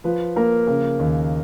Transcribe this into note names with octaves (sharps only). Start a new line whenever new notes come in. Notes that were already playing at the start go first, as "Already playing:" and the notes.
F3 B4
A#3 A#4
C#3 A#4
D#2